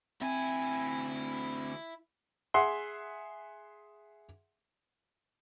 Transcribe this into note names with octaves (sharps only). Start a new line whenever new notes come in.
D2 C4 E4 G#5
G#4 E5 F#5 C6